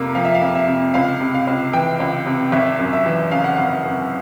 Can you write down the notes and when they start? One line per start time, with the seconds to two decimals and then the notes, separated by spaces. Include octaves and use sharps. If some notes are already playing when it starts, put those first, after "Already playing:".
Already playing: F2 C3 A#3
0.15 F3 F5
0.25 E5
0.35 F5
0.41 F2
0.55 E5
0.68 C3
0.94 C#2 F5
1.21 C3
1.34 F5
1.47 C#2
1.73 E3 G5
2.00 C#2
2.26 C3
2.52 G#1 E5
2.79 F#2
2.93 E5
3.06 E3
3.31 C#3 F5
3.44 F#5
3.56 G#1 F5
3.84 F#2